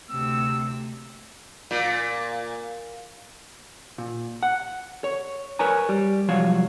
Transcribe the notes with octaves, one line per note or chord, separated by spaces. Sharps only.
D2 C3 E6
A#2
A#2
F#5
C#5
A#4 B4 C#5 G#5 A#5
G3
C2 F3 F#3 C#5 F5